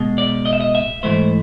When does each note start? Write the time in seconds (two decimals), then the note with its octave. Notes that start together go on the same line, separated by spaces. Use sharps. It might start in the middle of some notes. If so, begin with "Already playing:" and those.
Already playing: B2 G#3
0.18 D5
0.46 D#5
0.53 E5
0.61 D#5
0.75 E5
1.03 G#2 E3 A3 C5